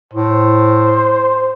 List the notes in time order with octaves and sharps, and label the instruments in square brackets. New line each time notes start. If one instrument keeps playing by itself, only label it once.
[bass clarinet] A2 [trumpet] C5